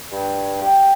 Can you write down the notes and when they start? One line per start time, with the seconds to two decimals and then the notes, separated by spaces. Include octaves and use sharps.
0.12 G2
0.61 G4